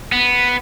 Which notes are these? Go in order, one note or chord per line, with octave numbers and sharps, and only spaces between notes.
B3